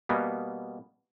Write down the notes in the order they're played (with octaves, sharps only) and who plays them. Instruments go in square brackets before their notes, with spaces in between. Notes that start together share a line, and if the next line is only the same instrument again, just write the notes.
[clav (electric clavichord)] B2 G3 A#3 B3